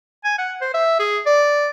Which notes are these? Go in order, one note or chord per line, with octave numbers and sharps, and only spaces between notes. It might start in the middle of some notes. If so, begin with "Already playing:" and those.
G#5
F#5
C5
E5
G#4
D5